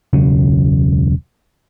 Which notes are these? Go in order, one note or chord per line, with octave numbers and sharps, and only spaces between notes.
E1 C#2 C#3 F#3